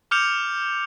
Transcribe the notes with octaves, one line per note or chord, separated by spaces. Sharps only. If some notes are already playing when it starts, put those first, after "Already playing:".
D6 F6 G6 C#7 F7